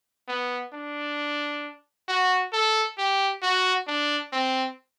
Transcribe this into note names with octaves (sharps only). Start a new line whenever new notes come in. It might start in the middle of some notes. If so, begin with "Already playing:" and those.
B3
D4
F#4
A4
G4
F#4
D4
C4